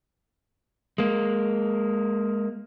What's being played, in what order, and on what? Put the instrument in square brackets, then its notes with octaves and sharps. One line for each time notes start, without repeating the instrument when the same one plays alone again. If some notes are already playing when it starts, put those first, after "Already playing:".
[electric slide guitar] G#3 A#3